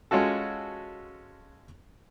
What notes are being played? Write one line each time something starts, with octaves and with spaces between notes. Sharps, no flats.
G#3 C#4 F4 F#4 A4